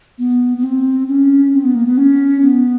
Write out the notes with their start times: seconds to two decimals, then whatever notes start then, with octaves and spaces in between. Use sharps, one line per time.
0.19 B3
0.58 B3
0.64 C4
1.08 C#4
1.53 C4
1.64 B3
1.75 A#3
1.86 B3
1.97 C#4
2.42 B3